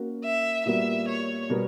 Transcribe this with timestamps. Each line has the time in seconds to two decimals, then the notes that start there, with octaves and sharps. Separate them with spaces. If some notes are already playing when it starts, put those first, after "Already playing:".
Already playing: A#3 C#4 F#4 A#4
0.24 E5
0.65 A#2 G3 B3 F#4 A#4 E5
1.08 C#5
1.49 B2 G3 B3 F#4 A#4